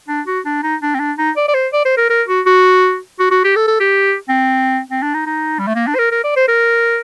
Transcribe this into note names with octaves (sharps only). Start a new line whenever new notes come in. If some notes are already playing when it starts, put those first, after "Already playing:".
D4
F#4
D4
D#4
D4
C4
D4
D#4
D5
D5
C5
D5
C5
A#4
A#4
F#4
F#4
F#4
F#4
G4
A4
A4
G4
C4
C4
D4
D#4
D#4
G3
A3
A#3
D4
C5
A#4
A#4
D5
C5
A#4